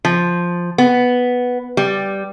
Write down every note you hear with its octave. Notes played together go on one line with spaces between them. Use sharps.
F3
B3
G3